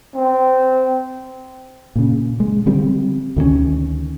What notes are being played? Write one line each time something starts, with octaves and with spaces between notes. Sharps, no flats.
C4
A#2 C#3
G#3
D3 F3 G3 C4
D2 D#3 E3 C#4